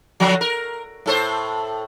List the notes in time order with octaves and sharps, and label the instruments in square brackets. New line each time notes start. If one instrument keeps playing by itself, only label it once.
[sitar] D3 F3 F#3
A#4
A2 A4 C5